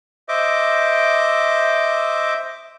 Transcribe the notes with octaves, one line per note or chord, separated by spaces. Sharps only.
C5 D#5 E5 D6